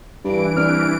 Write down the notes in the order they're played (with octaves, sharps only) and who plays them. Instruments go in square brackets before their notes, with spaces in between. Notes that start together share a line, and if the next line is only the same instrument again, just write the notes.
[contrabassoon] G2 [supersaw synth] E3 D7
[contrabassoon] C2 [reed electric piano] D4 F6